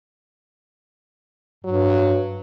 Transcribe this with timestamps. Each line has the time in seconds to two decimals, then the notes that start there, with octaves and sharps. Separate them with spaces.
1.64 G2 F#3